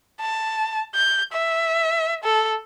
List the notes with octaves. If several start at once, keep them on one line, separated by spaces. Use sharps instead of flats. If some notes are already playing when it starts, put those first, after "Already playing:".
A5
G6
E5
A4